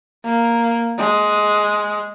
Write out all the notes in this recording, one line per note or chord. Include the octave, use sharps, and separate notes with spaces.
A#3
G#3